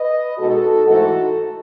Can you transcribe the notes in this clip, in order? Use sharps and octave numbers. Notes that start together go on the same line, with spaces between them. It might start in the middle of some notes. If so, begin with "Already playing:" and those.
Already playing: B4 D#5
B2 G#3 D#4 F#4 A4
G#2 E3 A3 D#4 F#4 A4